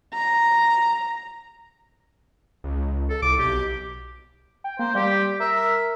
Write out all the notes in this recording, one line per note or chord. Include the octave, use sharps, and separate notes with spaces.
A#5
C#2
A4
C2 D6
B1 G4
G5
A#3 C5
G3 G4
A#4 E5